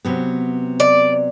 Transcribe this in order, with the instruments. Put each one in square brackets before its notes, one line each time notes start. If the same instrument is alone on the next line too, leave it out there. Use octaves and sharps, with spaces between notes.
[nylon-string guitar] C3 F#3 B3
[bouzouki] D5